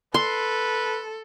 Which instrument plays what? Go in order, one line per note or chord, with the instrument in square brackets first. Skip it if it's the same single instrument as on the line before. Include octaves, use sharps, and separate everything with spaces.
[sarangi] A4 [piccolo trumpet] B4 [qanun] C6